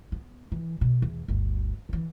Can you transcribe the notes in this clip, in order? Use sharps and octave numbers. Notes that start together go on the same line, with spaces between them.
B3
E3
B2
E2
G1 D2
D3 E3